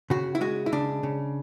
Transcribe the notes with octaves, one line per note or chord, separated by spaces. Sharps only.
C#3 F#4
E4
G#3 F#4
E4
C#3 D4
C#3